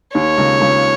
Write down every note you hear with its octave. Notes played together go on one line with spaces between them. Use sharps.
D#2 D#3 C#5
C#2 C#3
C#2 C#3